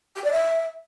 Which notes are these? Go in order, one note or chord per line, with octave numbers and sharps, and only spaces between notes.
G4
D5
E5